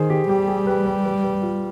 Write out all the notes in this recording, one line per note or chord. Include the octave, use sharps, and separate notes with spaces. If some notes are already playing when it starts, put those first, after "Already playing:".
Already playing: D#3 G#4 C5
G4
G3 G4
G#4
B4
B4
B4
B4
F4